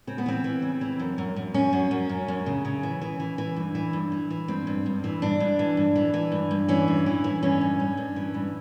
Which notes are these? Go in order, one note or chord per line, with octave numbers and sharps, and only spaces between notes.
C#3 C4
B3
E3 C4
E3
C#3
E3
F#2
F#2
F#2
F#2 C#4
F#2
F#2
F#2
F#2
C#3
C#3
E3
E3
E3
E3
G2
E3
G2
E3
E3
G2 C4
G2
G2
E3
G2 D4
G2
E3
G2
E3
E3
G2
G2
E3 C#4
G2
E3
E3
G2 C#4
G2
G2
G2
E3
G2